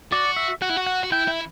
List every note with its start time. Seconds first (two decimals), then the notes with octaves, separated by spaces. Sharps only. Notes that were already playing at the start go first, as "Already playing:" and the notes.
0.12 F#4 D5
0.36 E5
0.62 F#4 F#5
0.69 E4
0.77 F#4
0.86 F#5
1.03 F#4
1.12 E4 G5
1.28 E4